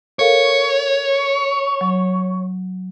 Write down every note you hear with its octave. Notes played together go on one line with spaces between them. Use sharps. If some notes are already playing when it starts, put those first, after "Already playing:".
A4 A#4 C#5 F5
F#3